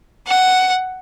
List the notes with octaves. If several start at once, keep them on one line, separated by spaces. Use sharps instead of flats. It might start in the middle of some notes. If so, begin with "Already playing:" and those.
F#5